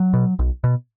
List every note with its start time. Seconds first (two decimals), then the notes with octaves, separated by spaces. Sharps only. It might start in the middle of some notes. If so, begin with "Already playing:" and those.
Already playing: F#3
0.14 B2
0.39 B1
0.64 B2